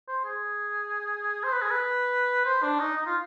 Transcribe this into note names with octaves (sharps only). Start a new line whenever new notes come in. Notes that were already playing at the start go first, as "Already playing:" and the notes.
C5
G#4
C5
B4
G#4
B4
C5
D4
D#4
D#4
F4